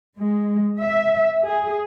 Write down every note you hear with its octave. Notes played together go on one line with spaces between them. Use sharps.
G#3
E5
G#4